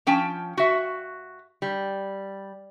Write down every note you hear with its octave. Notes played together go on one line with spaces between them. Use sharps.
F3 C#4 G5 A5
F#4 E5
G3